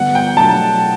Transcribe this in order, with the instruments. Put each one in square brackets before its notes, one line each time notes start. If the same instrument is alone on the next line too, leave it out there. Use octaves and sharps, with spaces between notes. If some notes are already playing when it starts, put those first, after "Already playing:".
Already playing: [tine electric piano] D3 G3 B3 [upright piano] F#5
[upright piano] G5
[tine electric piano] B2 F#3 A3 D4 [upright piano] A5